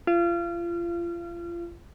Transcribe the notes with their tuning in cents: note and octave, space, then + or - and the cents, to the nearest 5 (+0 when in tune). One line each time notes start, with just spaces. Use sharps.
F4 -30